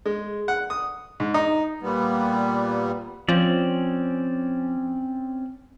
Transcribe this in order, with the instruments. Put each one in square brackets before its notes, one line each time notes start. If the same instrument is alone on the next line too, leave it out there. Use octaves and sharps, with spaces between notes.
[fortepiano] G#3
F#5
D#6
G#2
D#4
[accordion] A#2 G3 B3
[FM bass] F3 [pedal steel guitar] C4 C#4 D5